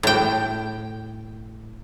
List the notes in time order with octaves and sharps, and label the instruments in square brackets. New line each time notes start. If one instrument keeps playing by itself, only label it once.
[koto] A2 G5